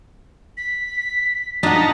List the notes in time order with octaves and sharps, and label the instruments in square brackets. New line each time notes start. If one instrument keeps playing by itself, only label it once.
[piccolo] B6
[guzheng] D4 [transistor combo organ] D#4 A5 A#5 [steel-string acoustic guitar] F4 F#5 [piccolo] B6